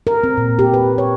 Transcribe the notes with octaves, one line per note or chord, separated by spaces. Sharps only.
A#4
C4
A#2
G4
B4
C#5